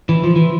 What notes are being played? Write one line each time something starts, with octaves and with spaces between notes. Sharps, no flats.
E3
F3
E3